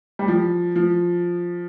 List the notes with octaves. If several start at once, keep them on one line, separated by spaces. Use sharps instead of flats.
G3
F3
F3